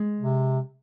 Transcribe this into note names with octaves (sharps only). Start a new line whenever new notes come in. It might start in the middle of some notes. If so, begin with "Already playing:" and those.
Already playing: G#3
C3